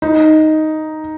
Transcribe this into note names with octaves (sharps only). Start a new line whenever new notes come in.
D#4